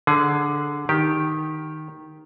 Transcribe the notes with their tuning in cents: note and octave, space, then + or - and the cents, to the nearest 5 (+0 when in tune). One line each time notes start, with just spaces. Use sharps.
D3 +0 G#4 +20
D#3 +0 G4 +0